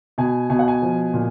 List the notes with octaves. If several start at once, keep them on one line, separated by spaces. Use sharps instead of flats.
B2 G#5
B2 G#5
F#5
G#5
F3
A#2